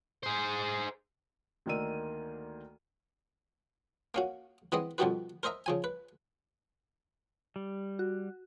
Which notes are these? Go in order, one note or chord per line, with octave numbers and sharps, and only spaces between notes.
G#4 C5
D2 D#3 A#3 D5 E6 D#7
A#3 C#4 F#4
E3 G#3 B3 C4 D#5
F2 B2 D#3 G3 F#4 B4
A#4 C5 D#5 E5 A#5
C#3 F3 G#5
B4
G3
F#4